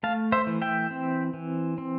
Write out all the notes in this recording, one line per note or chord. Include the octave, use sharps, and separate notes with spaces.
A3 F5 A5
C5 E5
E3
E5 G5
C4
E3
C4